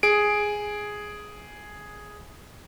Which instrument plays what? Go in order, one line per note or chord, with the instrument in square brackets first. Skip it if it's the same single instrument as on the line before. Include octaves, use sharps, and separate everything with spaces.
[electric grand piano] G#4 D7